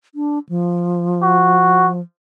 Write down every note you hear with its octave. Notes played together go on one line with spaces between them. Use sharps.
D4
F3
F#4